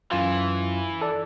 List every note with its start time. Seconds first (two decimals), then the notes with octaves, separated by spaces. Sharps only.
0.11 F#2 E3 F4
1.01 A4 D5